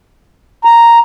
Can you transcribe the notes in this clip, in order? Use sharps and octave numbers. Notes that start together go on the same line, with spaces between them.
A#5